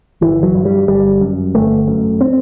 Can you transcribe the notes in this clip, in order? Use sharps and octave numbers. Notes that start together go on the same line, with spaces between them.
G1 E3
F#3
G2
G3
G1 G3
F#2
G1 A3
F#2
C4